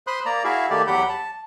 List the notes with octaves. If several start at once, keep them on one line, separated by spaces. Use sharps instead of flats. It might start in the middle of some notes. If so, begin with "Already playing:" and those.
C5 B5 C6 D#6 F#6
A#3 D5 A#5
E4 F#4 G#4 E5 F5
D#3 A3 A#3 G4 A4 D5
E2 F#3 G4 F#5 B5 G6
A5